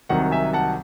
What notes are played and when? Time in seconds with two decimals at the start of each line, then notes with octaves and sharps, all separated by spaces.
0.09 C2 C3 D#3 F#3 F#5
0.31 E5 G#5
0.53 F#5 A5